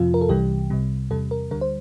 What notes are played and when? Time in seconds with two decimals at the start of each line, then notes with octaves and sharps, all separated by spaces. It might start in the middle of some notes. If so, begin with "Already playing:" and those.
Already playing: F2 C3 F3 F4
0.14 A#4
0.21 A4
0.29 C2 C3 E3 G3 G4
0.70 C2 C3 G3
1.11 E2 C3 G3 A4
1.31 A#4
1.51 D2 D3 G3 A#4
1.61 C5